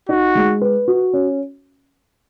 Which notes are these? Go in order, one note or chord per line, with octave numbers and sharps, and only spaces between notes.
D#4 F#4
G#3
B4
F#4
C#4